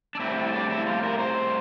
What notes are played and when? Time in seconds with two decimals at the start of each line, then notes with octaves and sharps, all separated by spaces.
0.15 D4
0.19 A2 G3 C4 E4
0.37 E4
0.53 D4
0.70 E4
0.86 F4
1.03 A#4
1.19 C5